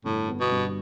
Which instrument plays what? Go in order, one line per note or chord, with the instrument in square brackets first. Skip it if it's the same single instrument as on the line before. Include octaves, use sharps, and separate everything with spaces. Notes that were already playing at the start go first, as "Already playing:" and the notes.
[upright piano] G1 [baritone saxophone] A2
[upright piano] B3
[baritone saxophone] B2
[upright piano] G2